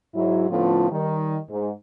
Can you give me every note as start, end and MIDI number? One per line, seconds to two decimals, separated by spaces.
0.15 0.49 44
0.15 0.49 54
0.15 0.49 64
0.50 0.90 45
0.50 0.90 50
0.50 0.90 53
0.50 0.90 59
0.50 0.90 61
0.50 0.90 65
0.91 1.37 51
0.91 1.37 55
1.50 1.70 44